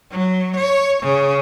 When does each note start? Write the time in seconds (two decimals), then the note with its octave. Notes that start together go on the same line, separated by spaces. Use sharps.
0.11 F#3
0.56 C#5
1.03 C#3